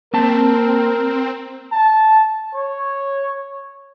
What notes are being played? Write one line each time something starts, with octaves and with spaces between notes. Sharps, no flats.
A#3 C4 A#4 A5
A5
C#5